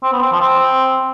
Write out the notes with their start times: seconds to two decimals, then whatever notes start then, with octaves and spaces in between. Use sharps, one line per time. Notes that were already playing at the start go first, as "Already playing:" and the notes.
0.03 C4
0.13 B3
0.22 C4
0.32 F3
0.41 C4